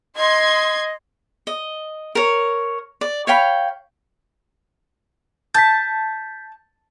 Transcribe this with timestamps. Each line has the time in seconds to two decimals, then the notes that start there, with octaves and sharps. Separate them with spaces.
0.16 D#5 C6 G#6
1.47 D#5
2.15 A#4 C#5
3.01 D5
3.27 C#5 F5 G5 B5
5.55 A5 G6 B6